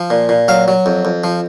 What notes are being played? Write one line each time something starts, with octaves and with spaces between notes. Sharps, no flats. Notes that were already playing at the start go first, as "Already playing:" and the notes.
Already playing: F3
A#2
A#2
F#3 F5
F#3
F2
F2
F3